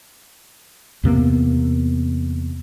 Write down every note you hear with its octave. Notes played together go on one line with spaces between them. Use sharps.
E2 C3 A#3 B3